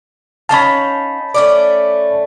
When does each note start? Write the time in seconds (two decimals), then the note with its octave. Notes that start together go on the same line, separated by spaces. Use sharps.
0.49 C#4 D#4 F5 A5 B5
1.34 A3 C#4 D5